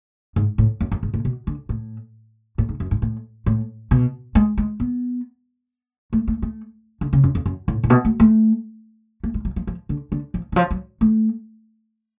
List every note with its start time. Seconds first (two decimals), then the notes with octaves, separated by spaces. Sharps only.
0.36 G#2
0.58 A2
0.81 F#2
0.92 F#2
1.03 G#2
1.14 A2
1.25 B2
1.47 D3
1.69 A2
2.58 A2
2.69 G#2
2.80 F#2
2.91 G#2
3.02 A2
3.46 A2
3.91 B2
4.35 G#3
4.58 G#3
4.80 B3
6.13 A3
6.28 A3
6.42 A3
7.01 D3
7.13 C#3
7.24 F#2
7.35 F2
7.46 F#2
7.68 A2
7.84 A2
7.90 B2
8.05 A3
8.20 A3
9.24 A3
9.34 G#3
9.45 F#3
9.56 F3
9.67 F3
9.89 D3
10.12 D3
10.34 F3
10.52 D3
10.56 F3
10.71 F#3
11.01 A3